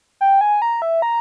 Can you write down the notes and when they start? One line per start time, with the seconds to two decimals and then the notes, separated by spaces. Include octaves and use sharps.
0.21 G5
0.41 G#5
0.62 A#5
0.82 E5
1.02 A#5